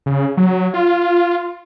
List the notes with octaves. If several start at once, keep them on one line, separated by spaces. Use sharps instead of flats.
C#3
F#3
F4